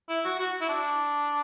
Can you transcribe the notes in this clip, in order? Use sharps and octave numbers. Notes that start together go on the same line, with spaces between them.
E4
F#4
F#4
E4
D4